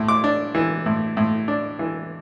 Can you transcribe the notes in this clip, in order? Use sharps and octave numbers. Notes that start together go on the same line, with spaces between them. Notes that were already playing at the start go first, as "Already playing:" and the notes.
Already playing: A2
D6
D4
E3
A2
A2
D4
E3